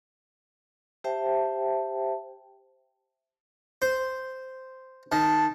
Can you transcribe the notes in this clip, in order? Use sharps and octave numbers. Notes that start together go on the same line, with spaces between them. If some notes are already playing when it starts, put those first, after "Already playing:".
G4 C5 E5 G5 A5
C5
D#3 A5